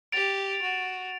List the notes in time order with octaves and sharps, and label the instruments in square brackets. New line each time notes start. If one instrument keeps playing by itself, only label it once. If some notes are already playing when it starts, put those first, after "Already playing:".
[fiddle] G4 [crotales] A6 D7 F7
[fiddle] F#4